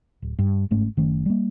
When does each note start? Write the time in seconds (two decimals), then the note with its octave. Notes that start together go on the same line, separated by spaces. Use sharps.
0.22 D1
0.39 G2
0.70 G1 G#2 A3 C#4
0.97 F#1 D#3 A3 C#4
1.26 G3 A#3